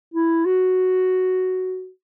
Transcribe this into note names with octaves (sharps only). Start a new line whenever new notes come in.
E4
F#4